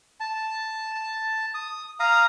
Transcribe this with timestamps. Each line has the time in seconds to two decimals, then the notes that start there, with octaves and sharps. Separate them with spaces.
0.20 A5
1.54 D#6
2.00 F5 A#5 D#6